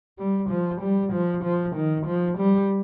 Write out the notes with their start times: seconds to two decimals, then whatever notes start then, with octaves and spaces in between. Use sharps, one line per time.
0.18 G3
0.50 F3
0.81 G3
1.13 F3
1.44 F3
1.76 D#3
2.06 F3
2.38 G3